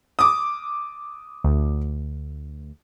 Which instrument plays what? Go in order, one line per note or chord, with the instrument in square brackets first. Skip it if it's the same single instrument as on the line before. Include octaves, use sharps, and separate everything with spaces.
[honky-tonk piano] D6 D#6
[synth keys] D2